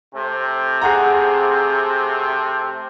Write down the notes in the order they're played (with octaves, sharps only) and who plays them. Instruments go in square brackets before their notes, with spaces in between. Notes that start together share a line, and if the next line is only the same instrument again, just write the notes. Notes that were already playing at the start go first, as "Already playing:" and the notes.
[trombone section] C3 A3 C4
[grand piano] G#4 F#5 A#5